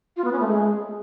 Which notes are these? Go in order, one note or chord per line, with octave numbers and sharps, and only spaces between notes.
F4
B3
C#4
A3
G#3